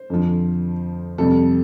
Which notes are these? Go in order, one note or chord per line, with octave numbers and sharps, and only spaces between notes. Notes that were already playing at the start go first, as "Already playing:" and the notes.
Already playing: C5
F2 D3 F3
F2 C3 G3 A4